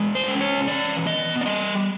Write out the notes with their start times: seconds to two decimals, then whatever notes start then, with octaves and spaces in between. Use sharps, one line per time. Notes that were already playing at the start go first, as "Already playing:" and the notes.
Already playing: E3 G#3
0.15 C5
0.28 C#4
0.41 C#5
0.67 E3 D5
1.06 B3 D#5
1.41 D5
1.46 G3 D#5